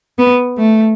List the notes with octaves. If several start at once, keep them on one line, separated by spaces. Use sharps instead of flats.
B3
A3